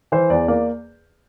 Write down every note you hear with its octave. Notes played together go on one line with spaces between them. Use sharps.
E3 C5
E2 D5
A#3 D5